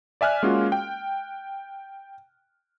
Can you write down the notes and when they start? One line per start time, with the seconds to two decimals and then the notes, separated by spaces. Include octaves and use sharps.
0.21 D5 E5 G#5 F6 F#6
0.43 G#3 A#3 C#4 F4 F#4
0.72 G5